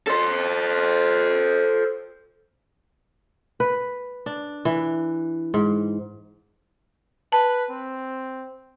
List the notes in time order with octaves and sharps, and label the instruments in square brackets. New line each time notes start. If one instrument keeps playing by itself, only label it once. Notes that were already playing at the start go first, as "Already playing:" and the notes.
[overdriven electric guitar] A4 C5
[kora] B4
D4
E3
G#2
[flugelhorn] B4 [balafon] A5
[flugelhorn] C4